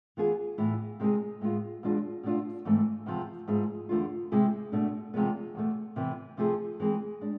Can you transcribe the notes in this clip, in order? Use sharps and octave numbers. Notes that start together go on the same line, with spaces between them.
E3 B3 F4 G#4
A2 E3 B3 E4
C3 G#3 C4 G#4
A2 G#3 B3 F4
E2 B2 G#3 D4 F4
B2 A3 D4 F4
G#2 E3 A3 C4
E2 C3 F3
G#2 F3 B3 E4 G#4
E2 D3 A3 D4 F4
C3 G#3 C4 E4 G#4
B2 A3 D4
E2 C3 F3 G#3 B3
E2 B2 A3
C3 E3 B3
C3 F3 A3 E4 G#4
E3 G#3 C4 G#4
G#3 D4